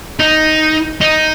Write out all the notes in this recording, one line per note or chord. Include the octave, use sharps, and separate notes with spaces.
D#4
D#4